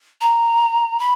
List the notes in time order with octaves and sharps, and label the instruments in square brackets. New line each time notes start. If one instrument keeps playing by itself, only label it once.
[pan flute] A#5
B5